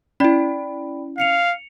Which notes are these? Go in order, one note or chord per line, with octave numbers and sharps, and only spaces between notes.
C#4 E4 D5 G5 B5
F5 C7 C#7 F7